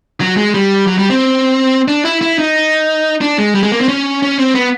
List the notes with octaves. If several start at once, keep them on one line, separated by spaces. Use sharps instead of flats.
F#3
G#3
G3
F#3
G3
C4
D4
E4
E4
D#4
D4
G#3
G3
G#3
A#3
C4
C#4
C#4
C4
B3